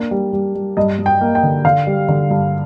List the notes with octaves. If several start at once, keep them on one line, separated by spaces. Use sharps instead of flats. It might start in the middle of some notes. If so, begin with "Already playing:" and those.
Already playing: A#3 D4
G3
G3
G3
G2 D#5
G2
G5
A#3
G5
D3
D3 F5
G3
D3
G2